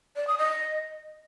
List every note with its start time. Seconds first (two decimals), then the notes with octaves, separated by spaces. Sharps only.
0.16 D5
0.27 D#6
0.39 D#5